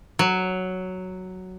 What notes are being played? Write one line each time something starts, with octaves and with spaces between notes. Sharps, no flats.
F#3